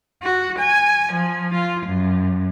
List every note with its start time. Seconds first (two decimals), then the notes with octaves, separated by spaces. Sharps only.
0.22 F#4
0.58 G#5
1.11 F3
1.53 F4
1.84 F#2